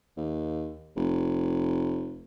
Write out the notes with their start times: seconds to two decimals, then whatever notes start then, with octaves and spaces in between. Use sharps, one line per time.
0.18 D#2
0.96 F1